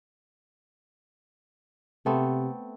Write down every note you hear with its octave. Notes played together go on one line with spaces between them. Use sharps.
C3 A3 B3 C4